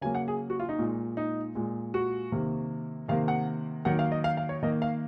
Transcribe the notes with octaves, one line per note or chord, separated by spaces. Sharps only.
C#3 F#3 A#3 G#5
F#5
G#4
F#4
F4
D#4
A#2 G#3
D#4
A#2 G#3
F#4
C3 D#3 A#3
C3 D#3 A#3 F5
F#5
D#3 F#3 A#3 F#5
F5
D#5
F5
F5
C#5
D#3 A#3 D#5
F5